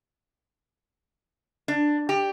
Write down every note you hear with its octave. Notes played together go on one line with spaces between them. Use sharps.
D4
G4